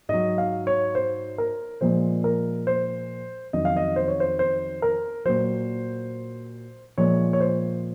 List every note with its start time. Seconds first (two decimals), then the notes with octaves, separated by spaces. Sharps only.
0.09 G#2 F#3 D#5
0.38 F5
0.67 C#5
0.95 C5
1.38 A#4
1.81 A#2 F3 G#3 C5
2.24 A#4
2.67 C5
3.53 F2 D#3 F#3 D#5
3.65 F5
3.77 D#5
3.96 C5
4.08 C#5
4.20 C5
4.39 C5
4.82 A#4
5.25 A#2 F#3 C5
6.98 A#2 F3 G#3 C#5
7.33 C#5
7.40 C5